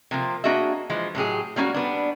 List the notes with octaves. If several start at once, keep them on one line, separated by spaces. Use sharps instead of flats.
C3 F3 A#3
A#3 D4 F#4 G#4 D#5 E5
E3 F3 G#3
A2 F#3 G4 G#4
G3 A#3 C#4 D#4 F#4
G3 B3 D4